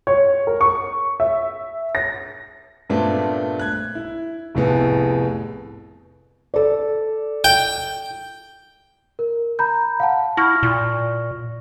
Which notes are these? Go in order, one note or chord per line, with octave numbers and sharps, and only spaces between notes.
C#5
A#4
C#6
E5
A#6
G2 A#2 A3 B3 C4 D4
F#6 G#6
E4
F1 C2 A2 B3 G#4
A4 D5
G5
A#4
A#5 B5 G6
F5 F#5 A5
E4 C#6 F6 A#6
A#2